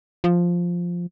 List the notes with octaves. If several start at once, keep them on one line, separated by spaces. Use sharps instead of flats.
F3